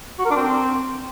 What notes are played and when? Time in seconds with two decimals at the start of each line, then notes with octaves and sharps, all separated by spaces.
0.19 F#4
0.25 A#4
0.31 D4
0.36 C4